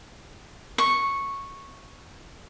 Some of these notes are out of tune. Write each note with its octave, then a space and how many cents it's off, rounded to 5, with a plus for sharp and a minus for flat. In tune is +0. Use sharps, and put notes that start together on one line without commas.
C#6 -5